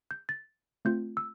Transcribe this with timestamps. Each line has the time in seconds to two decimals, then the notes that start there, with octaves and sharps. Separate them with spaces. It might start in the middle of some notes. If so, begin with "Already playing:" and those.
0.11 G6
0.29 A6
0.85 A3 C4 F4 G6
1.17 E6